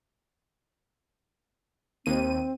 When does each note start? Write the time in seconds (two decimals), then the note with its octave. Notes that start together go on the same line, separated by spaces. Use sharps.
2.06 D#2 C4 D#7